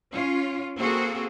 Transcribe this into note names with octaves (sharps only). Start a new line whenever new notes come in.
C#4 F4
A#3 C4 F#4 G#4 A4